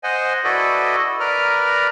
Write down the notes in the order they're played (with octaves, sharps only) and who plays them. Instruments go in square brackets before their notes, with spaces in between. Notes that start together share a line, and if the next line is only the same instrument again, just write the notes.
[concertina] C5 D#5 F#5 G#5
E4 F#4 A4 B4 D5 D#5
A#4 B4 D5 A#5 F6